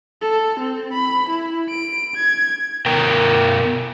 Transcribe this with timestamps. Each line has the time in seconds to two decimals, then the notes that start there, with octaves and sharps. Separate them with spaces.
0.22 A4
0.60 C4
0.93 B5
1.29 E4
1.70 D7
2.15 G#6
2.86 B2 A#4 G5